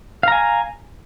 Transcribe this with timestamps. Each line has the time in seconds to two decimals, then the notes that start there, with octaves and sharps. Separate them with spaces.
0.23 F5
0.28 A#5
0.32 G#5